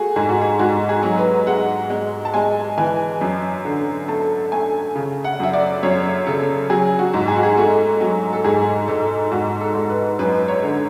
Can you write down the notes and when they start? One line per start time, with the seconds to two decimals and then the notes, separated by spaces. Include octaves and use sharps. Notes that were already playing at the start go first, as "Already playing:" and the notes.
Already playing: A3 F#4 G#4
0.16 G#2 G#4
0.29 F#4
0.41 G#4
0.59 G#2 F#4
0.89 G#4
1.03 F#3
1.18 B4
1.47 G#3 F#5
1.90 G#3
2.25 A5
2.34 G#3 G#5
2.78 E3 G#5
3.21 F#2
3.65 D3
4.08 A3 A5
4.52 A3 G#5
4.96 C#3
5.24 F#5
5.40 F#2 E5
5.53 D5
5.83 F#2 C#5
6.27 C#3 A4
6.70 F#3 G#4
6.99 F#4
7.14 G#2
7.28 G#4
7.36 F#4
7.43 G#4
7.57 A3 F#4
8.01 F#3
8.33 A4
8.44 G#2 G#4
8.88 G#2 A4
9.31 G#2 F#4
9.61 A4
9.75 G#2
9.90 B4
10.19 F#2 B4
10.48 C#5
10.62 D3